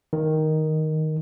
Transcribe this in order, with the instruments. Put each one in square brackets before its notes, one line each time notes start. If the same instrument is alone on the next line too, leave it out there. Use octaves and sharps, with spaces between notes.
[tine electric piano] D#3